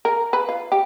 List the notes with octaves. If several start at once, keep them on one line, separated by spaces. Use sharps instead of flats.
A#4
B4
F4
G4